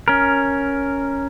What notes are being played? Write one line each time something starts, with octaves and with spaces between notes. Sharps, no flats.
C#4 A#4